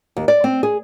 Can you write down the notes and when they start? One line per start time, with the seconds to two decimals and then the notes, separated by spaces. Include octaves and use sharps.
0.17 D#2
0.28 D5
0.44 C4
0.63 G#4